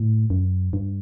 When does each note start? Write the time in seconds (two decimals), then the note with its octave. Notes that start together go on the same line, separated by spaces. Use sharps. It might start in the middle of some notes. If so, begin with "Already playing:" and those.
Already playing: A2
0.30 F#2
0.73 G2